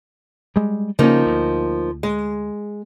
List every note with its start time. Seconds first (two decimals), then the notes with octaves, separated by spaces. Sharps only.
0.56 G3 G#3
0.99 C#3 F3 A#3 C#4 D#4
1.26 D2
2.03 G#3